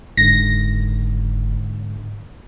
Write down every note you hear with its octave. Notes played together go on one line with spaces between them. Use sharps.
F#1 G#2 D3 A#6